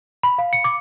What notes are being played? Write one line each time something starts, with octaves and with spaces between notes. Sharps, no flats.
B5
F5
C#7
D6